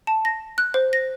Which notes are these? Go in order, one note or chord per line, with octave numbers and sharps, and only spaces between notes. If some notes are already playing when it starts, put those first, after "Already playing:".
A5
A#6
F#6
C5
A#6